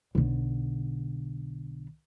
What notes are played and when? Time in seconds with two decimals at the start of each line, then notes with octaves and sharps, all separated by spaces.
0.15 B1 D3